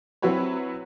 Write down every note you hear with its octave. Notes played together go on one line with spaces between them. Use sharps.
F#3 C4 E4 F#4 B4 C#5